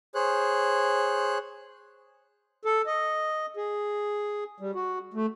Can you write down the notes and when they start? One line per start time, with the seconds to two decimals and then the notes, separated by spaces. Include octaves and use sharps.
0.15 G#4 C5 C#5 F#6
2.65 A4
2.86 D#5
3.57 G#4
4.60 G3
4.75 F#4
5.14 A3